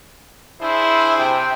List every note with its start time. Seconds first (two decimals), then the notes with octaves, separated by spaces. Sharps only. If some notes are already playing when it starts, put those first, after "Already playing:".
0.61 D4 E4 G#4 C5
1.17 C3 G5